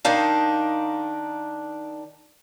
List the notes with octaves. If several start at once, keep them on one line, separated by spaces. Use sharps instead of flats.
D#3 D4 D#4 F5